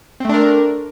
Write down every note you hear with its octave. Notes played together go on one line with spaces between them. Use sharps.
A3 C4 D4 A#4